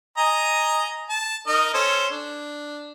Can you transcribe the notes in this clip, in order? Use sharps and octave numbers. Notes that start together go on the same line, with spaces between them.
D#5 G#5 A#5
A5
D#4 A#4 D#5
C#4 A4 C5
D4